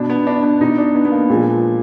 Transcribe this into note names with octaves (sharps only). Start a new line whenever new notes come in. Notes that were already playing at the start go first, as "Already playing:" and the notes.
Already playing: B2 D4
B3
D4
B3
B2 D#4
D4
B3
B3
A#3
A#2 F3 G#3